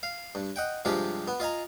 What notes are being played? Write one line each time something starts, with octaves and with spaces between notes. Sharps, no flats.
F5
G2
D#5 F#5 G5
G2 C3 F3 G#3 F4 G4
B3
F4 D#5 G#5 A#5